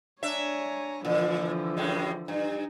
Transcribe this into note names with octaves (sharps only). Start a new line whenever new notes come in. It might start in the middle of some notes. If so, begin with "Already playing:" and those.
D4 C#5 E5 G#5 A#5
A#2 D3 E3 F3
F#2 A2 G#3
G2 D#4